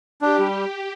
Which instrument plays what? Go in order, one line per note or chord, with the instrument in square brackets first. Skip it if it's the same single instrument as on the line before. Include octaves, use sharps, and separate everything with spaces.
[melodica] D4 [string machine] G4
[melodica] G3